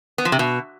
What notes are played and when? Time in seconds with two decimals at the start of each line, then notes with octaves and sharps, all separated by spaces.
0.18 B3
0.25 F3
0.32 C3
0.39 B2